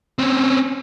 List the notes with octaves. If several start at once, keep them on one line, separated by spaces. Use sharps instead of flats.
C4 C#4